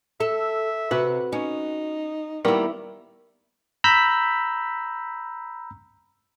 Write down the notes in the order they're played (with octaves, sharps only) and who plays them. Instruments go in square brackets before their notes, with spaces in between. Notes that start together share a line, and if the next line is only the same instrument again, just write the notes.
[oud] A4 [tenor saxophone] E5
[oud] C3 [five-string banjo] F#4 B4
[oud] C#4 [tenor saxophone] D#4
[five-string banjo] D#3 G3 A#3 [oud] B3 E4
[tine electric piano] A#5 B5 E6 G6 B6